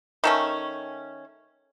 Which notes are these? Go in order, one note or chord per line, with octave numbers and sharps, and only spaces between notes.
D#3 A3 C#4